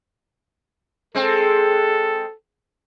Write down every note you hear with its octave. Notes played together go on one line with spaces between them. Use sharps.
G#3 C4 A4